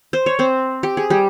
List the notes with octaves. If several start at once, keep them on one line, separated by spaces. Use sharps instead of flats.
C5
C#5
C4 C5
G4
G#4
G3 G4